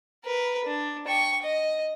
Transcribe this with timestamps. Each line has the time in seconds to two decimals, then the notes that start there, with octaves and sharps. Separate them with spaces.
0.25 A#4 B4
0.65 D4
1.07 G5 C#6
1.43 D#5